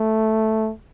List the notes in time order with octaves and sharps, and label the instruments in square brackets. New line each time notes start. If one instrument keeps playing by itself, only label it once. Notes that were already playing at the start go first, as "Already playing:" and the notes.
Already playing: [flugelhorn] A3